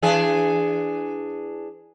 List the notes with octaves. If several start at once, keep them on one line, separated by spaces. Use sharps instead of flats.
E3 D4 G#4